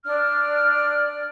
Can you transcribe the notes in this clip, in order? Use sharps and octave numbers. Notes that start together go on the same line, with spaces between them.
D4 D5 F6